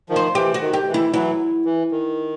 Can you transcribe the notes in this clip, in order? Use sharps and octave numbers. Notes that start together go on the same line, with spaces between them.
D#3 F3
C5
E3 G4
F#4
D#3
G4
E3
E4
E3 F#3 E4
E3
D#3